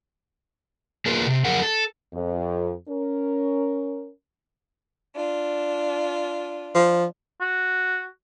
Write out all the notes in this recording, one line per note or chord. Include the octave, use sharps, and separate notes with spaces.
A#3 F4 G#4 A#4 B4
C3
F2 F#3 G#4 A#4 F#5
A4
F2
C#4 A#4
D4 F4
F3
F#4